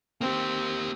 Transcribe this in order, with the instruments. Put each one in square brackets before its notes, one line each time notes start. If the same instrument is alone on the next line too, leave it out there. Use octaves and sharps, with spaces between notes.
[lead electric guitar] A#3 G4 [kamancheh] C4